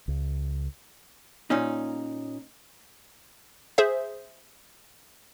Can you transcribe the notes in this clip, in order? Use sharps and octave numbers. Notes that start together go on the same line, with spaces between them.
C#2
A#2 C#4 D#4
G#4 C5 E5